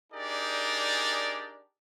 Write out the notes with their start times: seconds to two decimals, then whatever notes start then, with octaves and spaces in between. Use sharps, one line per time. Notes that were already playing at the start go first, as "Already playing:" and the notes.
0.13 D4 D#4 G4 G#4 A#4 D5